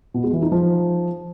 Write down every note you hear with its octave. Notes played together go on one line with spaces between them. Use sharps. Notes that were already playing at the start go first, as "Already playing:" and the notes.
B2
G#3
E3
D#4
F3